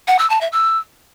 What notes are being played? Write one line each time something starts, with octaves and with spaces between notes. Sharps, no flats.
F#5
E6
A5
E5
E6